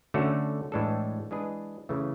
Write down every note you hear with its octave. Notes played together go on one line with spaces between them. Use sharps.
D3 A3 C#4 F#4 A4
A2 E3 G#3 D4 A4
E3 G#3 D4 G#4 B4
C#3 E3 A3